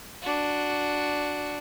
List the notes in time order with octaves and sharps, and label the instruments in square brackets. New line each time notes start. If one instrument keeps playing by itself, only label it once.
[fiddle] D4 F#4